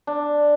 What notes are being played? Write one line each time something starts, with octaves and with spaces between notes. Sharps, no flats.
D4